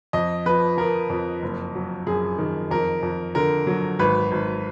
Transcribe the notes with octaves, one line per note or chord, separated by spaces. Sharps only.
F2 D#5
F3 B4
F3 A#4
F2
F#1
F#3
F#2 G#4
D#3
F2 A#4
F2
D3 A#4
F#3
G#1 B4
G#1